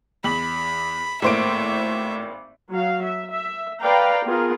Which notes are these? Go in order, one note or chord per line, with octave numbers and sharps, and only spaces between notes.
E2 B5 F#7
G#1 A2 A#3 C5 E5 D7
F#3 F5
E5
E5
B4 D5 F5 G5 A#5
B3 F4 G#4 A#4